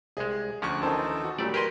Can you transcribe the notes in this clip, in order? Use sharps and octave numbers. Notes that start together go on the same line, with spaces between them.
C2 G#3 G#4
D2 F3 C#4 C#6 F#6
D#3 E3 D#4 A4 C5 A5
F#4
A#2 F#3 G3 A3 D5
G4 G#4 A#4 B4 D#5 C6